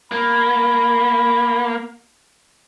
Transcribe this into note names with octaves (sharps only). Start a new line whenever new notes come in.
A#3 B5